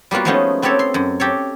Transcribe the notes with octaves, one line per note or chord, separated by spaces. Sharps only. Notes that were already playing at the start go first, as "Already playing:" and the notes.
G3 A#3 B3 F4 F#4
F3 G#3 A3 B3 C#4 D#4
B3 C4 G4 A4 C#5
C6
F#2
G4 A4 C#5